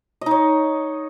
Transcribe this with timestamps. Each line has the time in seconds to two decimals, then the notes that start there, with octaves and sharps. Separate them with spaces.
0.21 D#5
0.26 D#4
0.31 C#5